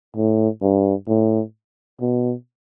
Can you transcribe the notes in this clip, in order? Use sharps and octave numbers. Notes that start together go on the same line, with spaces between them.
A2
G2
A2
B2